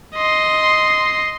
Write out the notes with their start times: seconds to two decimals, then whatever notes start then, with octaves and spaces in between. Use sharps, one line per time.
0.15 D#5 C6